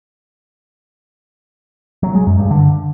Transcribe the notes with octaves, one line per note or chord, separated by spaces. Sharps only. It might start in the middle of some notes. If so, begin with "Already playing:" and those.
F#3
G#3
F#2
G2
D3